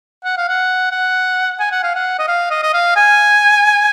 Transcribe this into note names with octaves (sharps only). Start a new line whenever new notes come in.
F#5
F5
F#5
F#5
G#5
F#5
F5
F#5
D#5
F5
D#5
D#5
F5
G#5